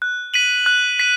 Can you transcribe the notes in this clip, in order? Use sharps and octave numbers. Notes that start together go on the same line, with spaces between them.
F#6
B6 D#7 F#7
F#6
B6 D#7